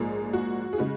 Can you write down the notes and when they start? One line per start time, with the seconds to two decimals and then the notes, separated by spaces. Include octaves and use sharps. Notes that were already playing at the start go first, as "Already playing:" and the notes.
Already playing: A#1 G#2 F3 A#3 G#4
0.33 F#4
0.73 G#4
0.78 C#3 G#3 F#4